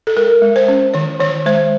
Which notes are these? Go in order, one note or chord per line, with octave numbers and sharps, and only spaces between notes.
A4
G#3 A#4
G#3
C5
C#4
D#3 C#5
D#3 C#5
G#3 C5